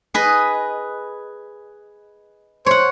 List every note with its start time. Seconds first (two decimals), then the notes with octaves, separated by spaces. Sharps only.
0.14 G#4 B4 D#5
2.66 C5 C#5 F#5